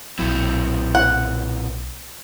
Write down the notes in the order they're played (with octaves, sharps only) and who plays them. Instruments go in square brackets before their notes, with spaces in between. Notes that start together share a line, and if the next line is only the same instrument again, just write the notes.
[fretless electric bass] B1 F#3 [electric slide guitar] A#2 C4 E4
[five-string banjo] F#5